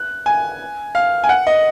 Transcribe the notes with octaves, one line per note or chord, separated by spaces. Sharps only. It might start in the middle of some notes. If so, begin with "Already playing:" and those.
Already playing: F#6
G#5
F5
G#5
F#5
D#5